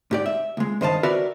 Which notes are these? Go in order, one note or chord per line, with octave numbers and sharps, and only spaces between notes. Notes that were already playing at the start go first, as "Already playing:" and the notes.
G#2 G4 D5
E5
C#2 G#3
G2 D#3 C5 D#5 F5 A5
F#4 A#4 B4 D5 E5